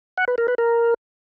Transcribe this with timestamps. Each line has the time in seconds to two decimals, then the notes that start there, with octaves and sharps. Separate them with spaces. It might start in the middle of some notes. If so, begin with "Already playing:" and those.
0.18 F#5
0.28 B4
0.38 A#4
0.48 B4
0.58 A#4